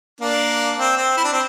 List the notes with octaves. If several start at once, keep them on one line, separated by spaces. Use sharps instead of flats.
A#3 D4
C4
C4
E4
D4
C4